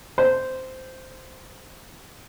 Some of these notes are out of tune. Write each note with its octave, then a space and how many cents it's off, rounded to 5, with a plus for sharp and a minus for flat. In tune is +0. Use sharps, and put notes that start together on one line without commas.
C5 -10